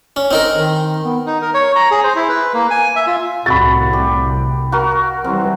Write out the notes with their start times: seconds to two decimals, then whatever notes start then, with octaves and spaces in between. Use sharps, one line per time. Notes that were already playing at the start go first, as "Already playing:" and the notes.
0.16 C#4
0.31 C4 D#4 A#4
0.56 D#3
1.05 B3
1.27 D#4
1.42 A#4
1.54 C#5
1.76 A#5
1.91 G#4
2.04 C5
2.16 E4
2.29 B4
2.54 A#3
2.70 G#5
2.96 E5
3.07 F4
3.46 C2 A2 C3 F#4 B5 A6
3.93 G4
4.72 F#4 A#4
5.24 E3 G3 C4